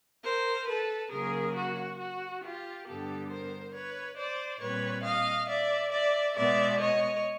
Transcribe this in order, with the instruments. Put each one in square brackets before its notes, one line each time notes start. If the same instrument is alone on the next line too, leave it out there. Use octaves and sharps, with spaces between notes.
[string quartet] A#4 C5
A4 B4
C#3 F#3 A#3 G#4 A#4
F#4
F#4
F4 G4
G2 D3 G3 B3 G4 A4
A#4 C5
B4 C#5
C5 D5
A#2 G3 C4 B4 C#5
D#5 F5
D5 E5
D5 E5
B2 G#3 B3 D5 E5
C#5 D#5